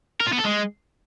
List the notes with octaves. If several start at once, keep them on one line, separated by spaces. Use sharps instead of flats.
A#4
F4
B3
A4
G#3